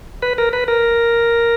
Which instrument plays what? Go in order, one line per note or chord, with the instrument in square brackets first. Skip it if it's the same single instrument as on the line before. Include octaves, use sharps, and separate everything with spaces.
[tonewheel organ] B4
A#4
B4
A#4